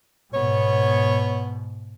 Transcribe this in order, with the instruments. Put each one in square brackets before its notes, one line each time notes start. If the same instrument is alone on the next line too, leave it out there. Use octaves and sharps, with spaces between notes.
[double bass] G#2 B2 [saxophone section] B3 C#5